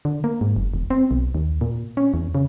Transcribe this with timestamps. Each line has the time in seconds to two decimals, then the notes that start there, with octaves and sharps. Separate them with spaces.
0.05 D3
0.24 A#3
0.41 G#2
0.56 F#1
0.74 E1
0.90 C4
1.11 B1
1.35 D#2
1.61 A#2
1.97 C#4
2.14 E2
2.35 C#3